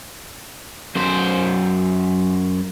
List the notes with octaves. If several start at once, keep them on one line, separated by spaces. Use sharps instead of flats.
F#2 C5